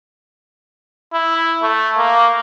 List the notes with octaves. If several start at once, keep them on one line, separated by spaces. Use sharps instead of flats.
E4
A3
A#3